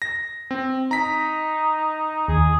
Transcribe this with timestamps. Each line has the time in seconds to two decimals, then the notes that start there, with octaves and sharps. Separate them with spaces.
0.02 A#6
0.51 C4
0.91 D#4 A#5 B6
2.28 D#2 G#4